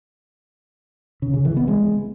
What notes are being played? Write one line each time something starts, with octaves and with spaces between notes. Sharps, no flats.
C#3
C#3
E3
B3
G#3